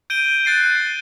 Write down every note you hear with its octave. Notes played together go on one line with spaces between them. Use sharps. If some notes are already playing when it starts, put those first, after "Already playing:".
G6 D7 D#7 G7
F#6 A6 C7 D#7